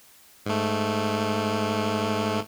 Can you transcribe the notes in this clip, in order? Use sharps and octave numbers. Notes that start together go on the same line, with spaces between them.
G#2 A3